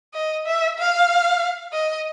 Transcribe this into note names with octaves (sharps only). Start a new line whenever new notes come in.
D#5
E5
F5
D#5